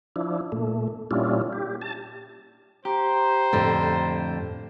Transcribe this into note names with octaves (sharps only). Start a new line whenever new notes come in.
F3 D4 E4
A#2 A3
A#2 G3 C#4 D4 E4 F4
G4
A5
G4 C5 A#5
F2 A2 D3